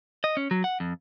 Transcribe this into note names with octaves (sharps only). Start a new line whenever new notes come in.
D#5
C#4
F#3
F#5
F2